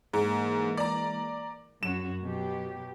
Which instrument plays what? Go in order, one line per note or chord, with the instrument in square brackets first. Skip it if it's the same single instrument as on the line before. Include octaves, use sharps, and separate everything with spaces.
[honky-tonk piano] G#2 [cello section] E3 G#3 A#3
[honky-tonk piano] D5 A#5
[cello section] F#2 C#4 F#4 [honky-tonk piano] E7
[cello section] B2 F#3 G4